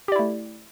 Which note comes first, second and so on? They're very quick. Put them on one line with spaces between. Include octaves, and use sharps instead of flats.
G4 D5 E4 A3